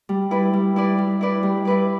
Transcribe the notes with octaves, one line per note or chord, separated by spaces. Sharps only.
G3
E4 B4 D5
G3
E4 B4 D5
G3
E4 B4 D5
G3
E4 B4 D5